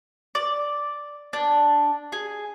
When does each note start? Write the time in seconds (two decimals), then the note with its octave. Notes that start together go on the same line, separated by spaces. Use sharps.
0.35 D5
1.33 D4
2.12 G#4